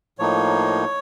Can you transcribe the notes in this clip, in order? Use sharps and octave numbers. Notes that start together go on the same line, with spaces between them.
A2 F3 A#3 D#4 C#5